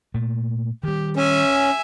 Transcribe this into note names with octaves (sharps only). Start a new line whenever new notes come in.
A#2 A3
D#3 G3 G4
C#4 E5 G#5